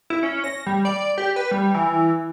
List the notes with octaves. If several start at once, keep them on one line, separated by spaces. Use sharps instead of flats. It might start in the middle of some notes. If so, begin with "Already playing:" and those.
E4
C#4
A#6
G3
D5
G4
B4
G3
E3